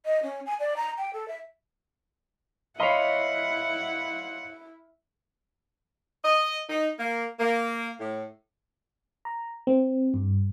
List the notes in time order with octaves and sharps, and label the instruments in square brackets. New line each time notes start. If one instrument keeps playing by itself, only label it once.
[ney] D#5
C#4
G#5
D5
A#5
G5
A4
E5
[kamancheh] E4 [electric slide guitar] C#5 D#5 [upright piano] F5 B5 C6 [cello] F#5
[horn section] D#5
D#4
A#3
A#3
A2
[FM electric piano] A#5
C4
G2